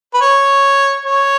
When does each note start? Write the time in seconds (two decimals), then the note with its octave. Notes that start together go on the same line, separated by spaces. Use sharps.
0.14 B4
0.21 C#5
1.05 C#5